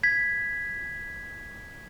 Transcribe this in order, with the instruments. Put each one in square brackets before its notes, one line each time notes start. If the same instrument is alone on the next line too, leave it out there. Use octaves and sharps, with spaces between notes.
[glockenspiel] G#6 B6